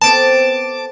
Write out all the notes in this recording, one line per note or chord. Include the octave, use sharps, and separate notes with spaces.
B3 C4 A4 A5 D6 D7